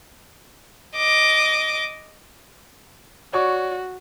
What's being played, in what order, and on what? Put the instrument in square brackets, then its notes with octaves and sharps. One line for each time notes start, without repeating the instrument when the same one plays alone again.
[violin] D#5 D6
[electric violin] F#4 [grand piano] C#5 D5 C#6